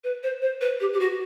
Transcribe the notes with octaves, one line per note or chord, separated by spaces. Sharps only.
B4
C5
C5
B4
G4
G4
F#4